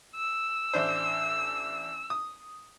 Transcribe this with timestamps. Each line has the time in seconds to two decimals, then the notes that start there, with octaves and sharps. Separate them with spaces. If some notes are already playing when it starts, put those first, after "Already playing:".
0.16 E6
0.73 A1 D4 C5
2.10 D#6